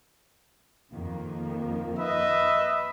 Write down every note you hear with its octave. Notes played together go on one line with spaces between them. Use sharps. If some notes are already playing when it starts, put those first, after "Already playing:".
F2 D#3 A#3
B4 D#5 E5